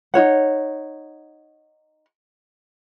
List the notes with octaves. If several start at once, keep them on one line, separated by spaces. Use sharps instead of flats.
D#4 F#4 C#5 F#5